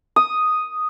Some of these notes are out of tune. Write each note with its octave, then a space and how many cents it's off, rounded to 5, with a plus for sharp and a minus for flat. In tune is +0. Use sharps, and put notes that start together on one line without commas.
D#6 +0